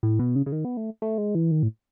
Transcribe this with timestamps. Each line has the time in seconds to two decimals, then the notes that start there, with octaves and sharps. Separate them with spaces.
0.03 A2
0.19 B2
0.36 C#3
0.46 C#3
0.52 D#3
0.65 B3
0.77 A3
1.02 A3
1.18 G#3
1.35 E3
1.51 D#3
1.63 A2